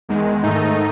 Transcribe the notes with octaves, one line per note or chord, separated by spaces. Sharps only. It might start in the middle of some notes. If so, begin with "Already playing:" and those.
E2 D#3 G#3
G#2 D#3 A3 D#4